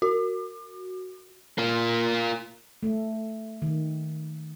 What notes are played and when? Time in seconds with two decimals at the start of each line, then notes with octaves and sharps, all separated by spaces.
0.02 F#4
1.58 A#3 F4
2.83 A3
3.62 D#3